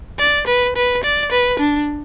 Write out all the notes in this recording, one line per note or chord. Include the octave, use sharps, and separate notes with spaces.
D5
B4
B4
D5
B4
D4